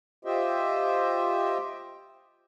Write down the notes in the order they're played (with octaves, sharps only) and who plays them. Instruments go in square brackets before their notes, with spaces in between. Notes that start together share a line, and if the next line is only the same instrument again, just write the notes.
[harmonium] F4 G4 C5 D#5 E5 G5